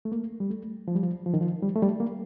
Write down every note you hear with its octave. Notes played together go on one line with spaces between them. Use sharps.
A3
A#3
G3
A3
F3
G3
F3
F3
D#3
F3
G3
A3
G3
A#3